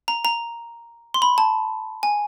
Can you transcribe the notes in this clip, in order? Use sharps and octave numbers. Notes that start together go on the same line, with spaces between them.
A#5
A#5
C6
B5
A5
G#5